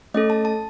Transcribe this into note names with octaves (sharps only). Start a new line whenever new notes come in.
A3 C#4 A4 D#5
A5
A5